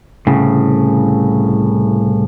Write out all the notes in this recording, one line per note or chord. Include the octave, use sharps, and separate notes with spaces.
C2 A2 C#3